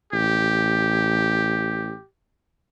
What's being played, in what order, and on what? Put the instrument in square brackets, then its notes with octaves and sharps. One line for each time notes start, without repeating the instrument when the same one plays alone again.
[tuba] A1 [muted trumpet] G4